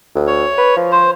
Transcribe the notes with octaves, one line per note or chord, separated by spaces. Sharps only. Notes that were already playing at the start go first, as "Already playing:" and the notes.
D2
C#5
B4
F3
C5